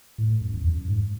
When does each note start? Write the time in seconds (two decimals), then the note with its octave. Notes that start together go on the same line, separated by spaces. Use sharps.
0.18 A2
0.41 F#2
0.54 E2
0.65 F#2
0.88 G#2